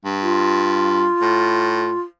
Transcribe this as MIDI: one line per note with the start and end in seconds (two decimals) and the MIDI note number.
0.05 1.07 43
0.22 2.01 65
1.22 1.93 45